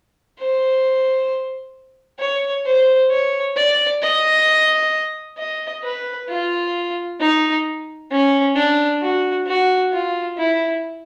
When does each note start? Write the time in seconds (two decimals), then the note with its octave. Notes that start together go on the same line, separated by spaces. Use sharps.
0.39 C5
2.20 C#5
2.66 C5
3.10 C#5
3.57 D5
4.02 D#5
5.38 D#5
5.83 B4
6.29 F4
7.20 D#4
8.11 C#4
8.55 D4
9.02 F#4
9.47 F#4
9.92 F4
10.38 E4